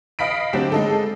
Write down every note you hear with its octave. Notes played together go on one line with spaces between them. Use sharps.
D#5 F5 B5 B6 D7
D3 F#3 C4 D4 G4
G#3 D#4 A4